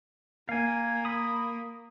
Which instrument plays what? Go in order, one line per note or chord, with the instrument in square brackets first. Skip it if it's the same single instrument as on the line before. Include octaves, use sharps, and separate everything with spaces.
[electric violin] A#3 [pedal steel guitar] F5 G#5
[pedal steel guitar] B5 D#6